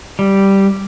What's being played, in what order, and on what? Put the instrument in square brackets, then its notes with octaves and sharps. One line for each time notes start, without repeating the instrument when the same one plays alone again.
[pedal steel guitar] G3